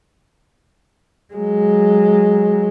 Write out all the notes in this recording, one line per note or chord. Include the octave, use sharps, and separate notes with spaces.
F#3 G#3